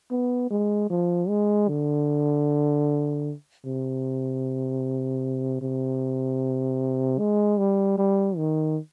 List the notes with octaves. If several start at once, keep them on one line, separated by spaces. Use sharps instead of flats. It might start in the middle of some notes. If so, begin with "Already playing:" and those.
B3
G#3
F3
G#3
D3
C3
C3
G#3
G3
G3
D#3